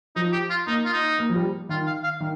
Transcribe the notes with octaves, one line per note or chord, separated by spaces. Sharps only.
F3 D#4
G4
F4
A#3 D#4
F4
D#4
A#3
F3
G3
D#3 F4
F5
F5
D#3